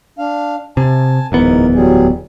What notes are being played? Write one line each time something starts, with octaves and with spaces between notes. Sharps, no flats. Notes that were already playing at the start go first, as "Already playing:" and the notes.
D4 F5
C3 G#5 A5
D1 E2 G#2 B3 A#4
F#3 G3 G#4